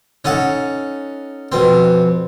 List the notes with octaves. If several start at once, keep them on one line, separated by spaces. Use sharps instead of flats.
C#4 D#4 A4 F#5
F2 B2 C4